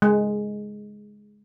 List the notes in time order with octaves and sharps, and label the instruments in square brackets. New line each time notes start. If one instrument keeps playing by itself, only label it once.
[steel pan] G#3